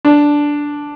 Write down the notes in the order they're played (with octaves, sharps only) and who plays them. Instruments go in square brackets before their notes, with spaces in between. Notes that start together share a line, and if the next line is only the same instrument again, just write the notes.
[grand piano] D4